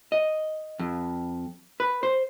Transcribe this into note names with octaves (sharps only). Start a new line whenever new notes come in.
D#5
F2
B4
C5